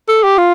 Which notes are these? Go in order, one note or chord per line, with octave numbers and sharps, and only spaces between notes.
A4
G4
F4